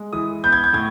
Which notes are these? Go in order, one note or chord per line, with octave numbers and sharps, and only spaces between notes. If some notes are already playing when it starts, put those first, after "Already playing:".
Already playing: G#3
E3 D#6
B3 G6
G#6
G6
A2 G#6